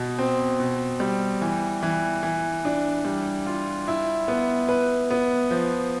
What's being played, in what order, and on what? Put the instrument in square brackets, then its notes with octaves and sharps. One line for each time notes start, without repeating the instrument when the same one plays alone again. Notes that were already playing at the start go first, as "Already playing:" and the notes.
Already playing: [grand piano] B2
C4
B2
G3
E3
E3
E3
D4
G3
F4
E4
B3
B4
B3
F3